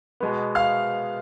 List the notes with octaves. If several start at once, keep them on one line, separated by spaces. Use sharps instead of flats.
B2 G#3 B3
F5 F6